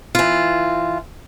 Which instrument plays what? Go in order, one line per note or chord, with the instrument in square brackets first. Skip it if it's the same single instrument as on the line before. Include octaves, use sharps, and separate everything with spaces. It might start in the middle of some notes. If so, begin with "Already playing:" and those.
[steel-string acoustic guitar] E3 F4